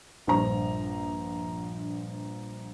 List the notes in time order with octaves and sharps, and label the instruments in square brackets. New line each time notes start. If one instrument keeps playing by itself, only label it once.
[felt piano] A#1 G2 C5 A#5